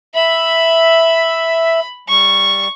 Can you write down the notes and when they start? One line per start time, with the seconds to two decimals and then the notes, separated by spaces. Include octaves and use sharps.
0.15 E5 B5
2.08 G3 C#6